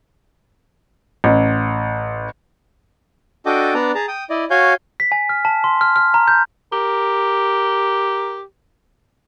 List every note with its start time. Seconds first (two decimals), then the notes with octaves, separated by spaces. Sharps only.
1.24 A1
3.46 D4 F#4 A4 D#5 G5 D6
3.74 B3 D4 D5 A5 A#5
3.95 G#4 A5 A#5
4.08 G5 D#6
4.30 E4 D5 D#5
4.50 F#4 C#5 F5 G#5 G6
5.00 B6
5.12 G#5
5.29 F6
5.45 A5
5.64 C6
5.81 F6
5.96 F6
6.14 A#5
6.28 G6
6.73 G4 A#4